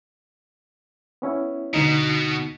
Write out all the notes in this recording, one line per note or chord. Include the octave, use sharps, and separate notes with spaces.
B3 C#4 E4
D2 B2 D#4